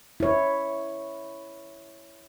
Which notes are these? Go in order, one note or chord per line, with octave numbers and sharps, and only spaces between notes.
E4 C#5